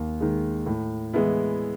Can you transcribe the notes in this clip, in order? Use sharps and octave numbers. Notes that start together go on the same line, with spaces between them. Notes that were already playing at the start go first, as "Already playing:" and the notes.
Already playing: D#2
D#3 G#3
A2
E3 G#3 B3 E4